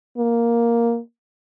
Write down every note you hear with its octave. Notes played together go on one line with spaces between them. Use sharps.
A#3